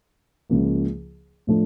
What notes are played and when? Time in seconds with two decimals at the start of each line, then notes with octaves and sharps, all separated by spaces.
0.50 C#2 C#3 F3 A#3
1.47 A2 F3 A3 D4 A4